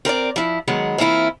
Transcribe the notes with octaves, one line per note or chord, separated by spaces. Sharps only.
C4 A#4 B4 D5
F3 E4
D#3 F#3 G#3 B3
E3 A#3 C4 E4 F4